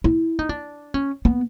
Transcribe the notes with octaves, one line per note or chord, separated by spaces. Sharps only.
E4
D#4
D4
C#4
B3